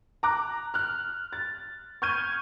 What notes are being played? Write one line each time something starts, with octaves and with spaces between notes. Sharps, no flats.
A#5 D6 F#6
F6 F#6
A6
C#6 F6 G6 G#6 D#7